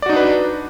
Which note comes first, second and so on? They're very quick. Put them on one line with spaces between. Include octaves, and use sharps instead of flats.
D5 F#4 D#4 D4 B4